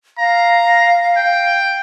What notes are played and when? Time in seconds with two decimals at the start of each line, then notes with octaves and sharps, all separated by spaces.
0.18 F5 A#5
1.17 G5